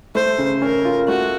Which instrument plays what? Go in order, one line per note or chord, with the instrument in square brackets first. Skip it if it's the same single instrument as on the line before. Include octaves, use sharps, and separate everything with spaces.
[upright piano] A3 [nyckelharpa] C5
[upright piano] C#3
[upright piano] C#4 [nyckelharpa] A#4
[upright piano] F4
[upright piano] A3 [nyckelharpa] F#4